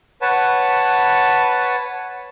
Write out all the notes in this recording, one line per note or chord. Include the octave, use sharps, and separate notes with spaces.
B4 C#5 F#5 A5